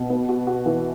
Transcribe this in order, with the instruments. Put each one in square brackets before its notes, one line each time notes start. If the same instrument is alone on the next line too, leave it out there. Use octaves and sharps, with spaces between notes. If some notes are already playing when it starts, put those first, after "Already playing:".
Already playing: [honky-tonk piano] B2
B3
F#4
F#4
E3